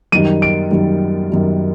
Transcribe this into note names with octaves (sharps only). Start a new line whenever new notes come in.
F#2 D#3 G3 D#7
D7
F#2 D#3 G3
F#2 D#3 G3